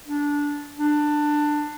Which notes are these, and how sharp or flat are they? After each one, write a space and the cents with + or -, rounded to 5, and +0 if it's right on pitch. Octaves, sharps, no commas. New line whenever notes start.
D4 -15
D4 +15